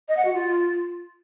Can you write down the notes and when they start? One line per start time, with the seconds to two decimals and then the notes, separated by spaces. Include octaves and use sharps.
0.08 D#5
0.17 F#5
0.25 F#4
0.33 F4